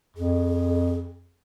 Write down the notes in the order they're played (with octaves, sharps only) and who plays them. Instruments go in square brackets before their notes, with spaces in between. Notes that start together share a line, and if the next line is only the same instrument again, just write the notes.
[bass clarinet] F2 [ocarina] G#4